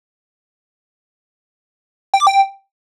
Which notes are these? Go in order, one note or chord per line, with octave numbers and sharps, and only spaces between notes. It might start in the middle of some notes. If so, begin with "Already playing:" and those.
G5
D6
G5